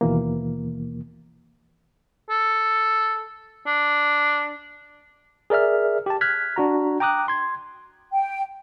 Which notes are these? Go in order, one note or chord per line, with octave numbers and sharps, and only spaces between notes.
D#2 B2 E3 A#3
A4
D4
G#4 A#4 D5 E5 F6
G4 A5
F6 F#6 G#6 B6
D4 F#4 A#5
G5 A#5 D6 D#6 F#6
C6 G#6
G5